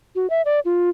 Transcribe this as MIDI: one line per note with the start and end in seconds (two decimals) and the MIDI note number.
0.15 0.29 66
0.30 0.42 76
0.45 0.60 74
0.65 0.89 65